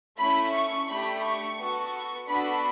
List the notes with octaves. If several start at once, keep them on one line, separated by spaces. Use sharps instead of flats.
A3 C#4 E4 B5
C#6
A3 D4 G4 B5
C#6
B3 F#4 A4
B3 D4 F#4 A4 B5